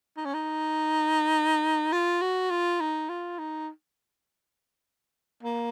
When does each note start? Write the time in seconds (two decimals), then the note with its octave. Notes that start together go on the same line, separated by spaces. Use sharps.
0.17 D#4
0.25 C#4
0.34 D#4
1.92 F4
2.21 F#4
2.51 F4
2.80 D#4
3.09 F4
3.39 D#4
5.43 A#3